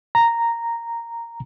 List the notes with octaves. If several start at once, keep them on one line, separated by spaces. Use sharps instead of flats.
A#5